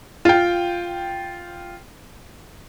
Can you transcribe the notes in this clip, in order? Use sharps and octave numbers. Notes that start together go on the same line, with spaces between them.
F4 G5